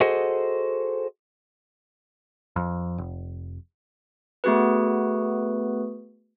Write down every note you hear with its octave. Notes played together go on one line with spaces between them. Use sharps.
F#4 G#4 A4 C5 D#5 F#5
F2
F1
A3 B3 F#4 G#4 B4